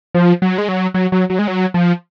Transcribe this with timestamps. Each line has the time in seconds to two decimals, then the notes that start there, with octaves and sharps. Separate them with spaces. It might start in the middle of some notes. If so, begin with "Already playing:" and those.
0.14 F3
0.42 F#3
0.58 G#3
0.68 F#3
0.94 F#3
1.12 F#3
1.30 F#3
1.39 G#3
1.48 F#3
1.74 F3